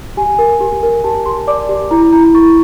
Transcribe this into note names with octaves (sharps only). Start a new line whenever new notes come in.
G4 G#5
A#4
G4
A#4
G4 A5
G4 C6
D5 D6
G4
E4 A#5
E4 A#5
E4 C#6